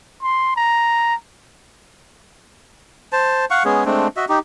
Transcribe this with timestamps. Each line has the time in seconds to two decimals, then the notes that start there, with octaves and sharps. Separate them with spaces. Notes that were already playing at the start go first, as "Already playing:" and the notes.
0.22 C6
0.56 A#5
3.12 C5 A5
3.51 F5 F#5 C#6
3.65 G#3 B3 C#4 G#4
3.86 G#3 A3 C4 D4
4.17 F#4 D#5 E5
4.29 D#4 G4